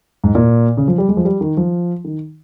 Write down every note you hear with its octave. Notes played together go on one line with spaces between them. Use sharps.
G#2
A#2
C#3
F3
G3
G#3
F3
G3
D#3
F3
D#3